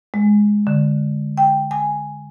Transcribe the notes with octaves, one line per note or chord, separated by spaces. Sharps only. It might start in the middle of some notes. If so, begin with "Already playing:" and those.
G#3
D3
G5
G#5